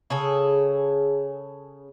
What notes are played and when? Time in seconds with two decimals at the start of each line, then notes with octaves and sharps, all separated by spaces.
0.10 C#3 G#4 A4